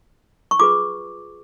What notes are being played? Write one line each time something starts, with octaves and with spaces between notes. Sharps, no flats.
C#6
F4 G#4 B4 D6